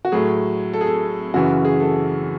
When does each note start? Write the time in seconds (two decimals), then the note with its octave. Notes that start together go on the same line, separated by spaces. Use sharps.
0.05 F#4
0.12 A2 F#3 G#4
0.74 A4
0.81 G#4
0.87 A4
1.34 F#2 C#3 E3 F#4
1.65 G#4
1.80 A4